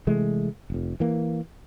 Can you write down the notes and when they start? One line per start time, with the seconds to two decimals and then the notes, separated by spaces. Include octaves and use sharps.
0.07 C3 E3 G#3 A3
0.70 F1 F2
1.00 E3 A#3